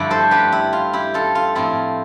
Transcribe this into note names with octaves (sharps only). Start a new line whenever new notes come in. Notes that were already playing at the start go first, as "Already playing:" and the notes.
Already playing: G2 D3 F3 A3 E4 D5
A4 C5
G4 B4
E4
F4
E4 G4
F4 A4
F4
A2 F3 C4 E4 F4